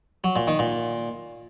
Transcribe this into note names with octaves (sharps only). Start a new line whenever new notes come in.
F#3
A#2
D#3
A#2